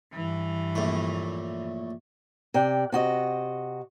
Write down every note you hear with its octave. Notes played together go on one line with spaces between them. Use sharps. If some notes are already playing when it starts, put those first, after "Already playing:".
G2 E3
A#1 A2
C3 D5 G5
C3 F#4 D#5